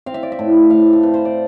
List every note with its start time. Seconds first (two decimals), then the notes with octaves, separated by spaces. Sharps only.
0.06 C4 F5
0.14 E5
0.23 D5
0.32 E5
0.39 A2
0.70 A2 F5
0.93 A4
1.03 C4 B4
1.14 C5
1.25 D5